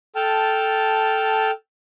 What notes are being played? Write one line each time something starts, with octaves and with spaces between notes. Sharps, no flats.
A4 G5 A5 F6